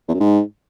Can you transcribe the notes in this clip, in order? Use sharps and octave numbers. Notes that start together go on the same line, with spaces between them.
E2
F#2
G#2